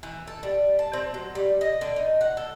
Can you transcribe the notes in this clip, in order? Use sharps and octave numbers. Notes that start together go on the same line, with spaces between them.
E3
A4
G3
A5
C4
F#3
G3
D#5
D3
D#4
F#5
A4